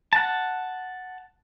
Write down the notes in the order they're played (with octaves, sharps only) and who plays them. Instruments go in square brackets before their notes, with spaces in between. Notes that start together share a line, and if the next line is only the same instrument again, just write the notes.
[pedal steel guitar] F#5 A5